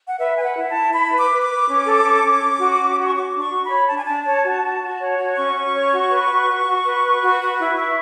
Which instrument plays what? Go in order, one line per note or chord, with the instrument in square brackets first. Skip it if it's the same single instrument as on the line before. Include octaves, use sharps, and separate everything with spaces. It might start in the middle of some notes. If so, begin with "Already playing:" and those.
[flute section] F#5
B4 E5
B4 G#5
F#5
E4
A5
E4
E4 B5
B4
D6
B4
D6
B4
C#4
A4
C#4
C#4
C#4
F#4
C#4
F#4
C#6
F#4 D6
D4
C#6
F#4
B5
C#5
D4 A5
G#5
D4 A5
C#5
F#4
F#4
F#4
C#5
F#4
C#4 C#6
C#4
C#5
F#4
B4
F#4
F#4
F#4
B4
B4
F#4
B4
E4
E4